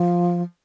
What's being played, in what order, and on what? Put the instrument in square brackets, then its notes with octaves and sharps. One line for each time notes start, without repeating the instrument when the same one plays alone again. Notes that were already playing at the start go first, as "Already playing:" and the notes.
Already playing: [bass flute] F3